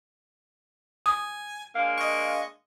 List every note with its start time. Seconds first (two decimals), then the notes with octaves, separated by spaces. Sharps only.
1.06 G#5 D#6
1.75 G#3 A#3 D4 F5
1.98 D#5 C#6